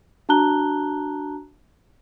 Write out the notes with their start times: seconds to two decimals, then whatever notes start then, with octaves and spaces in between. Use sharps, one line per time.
0.29 D4 F#4 A5 A#5 F#6 G7